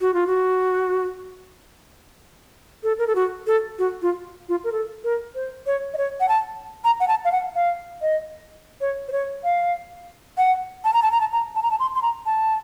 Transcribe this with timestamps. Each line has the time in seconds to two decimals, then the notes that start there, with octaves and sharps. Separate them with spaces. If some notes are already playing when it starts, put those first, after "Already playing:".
0.01 F#4
0.14 F4
0.27 F#4
2.83 A4
2.98 A#4
3.07 A4
3.15 F#4
3.47 A4
3.79 F#4
4.02 F4
4.49 F4
4.64 A#4
4.72 A4
5.04 A#4
5.35 C5
5.66 C#5
5.94 D#5
5.97 C#5
6.20 F#5
6.29 A5
6.84 A#5
7.00 F#5
7.08 A5
7.25 F5
7.32 F#5
7.55 F5
8.02 D#5
8.81 C#5
9.08 C5
9.12 C#5
9.44 F5
10.38 F#5
10.84 A5
10.94 A#5
11.02 A5
11.12 A#5
11.20 A5
11.32 A#5
11.55 A5
11.63 A#5
11.71 A5
11.80 C6
11.95 C6
12.02 A#5
12.26 A5